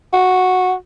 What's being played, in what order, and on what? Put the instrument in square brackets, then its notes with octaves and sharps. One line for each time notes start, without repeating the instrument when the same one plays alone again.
[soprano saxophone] F#4